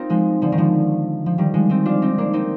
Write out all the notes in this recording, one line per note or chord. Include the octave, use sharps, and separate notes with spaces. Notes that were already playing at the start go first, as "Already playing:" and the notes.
Already playing: A#3 C4 D#4 F4
F3 G#3
D3 F3
D#3
D3 F3
F3
D#3 G3
F3 G#3
C4 D#4
D4 F4
C4 D#4
A#3 D4
C4 D#4